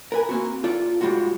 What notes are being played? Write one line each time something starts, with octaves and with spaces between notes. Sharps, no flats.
A#4 B4 G#5
A#3 C4 F#4
F4 A4 D5
G#2 G3 G#3 F4 F#4